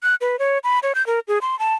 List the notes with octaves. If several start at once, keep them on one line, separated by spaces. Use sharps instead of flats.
F#6
B4
C#5
B5
C#5
G6
A#4
G#4
C6
A5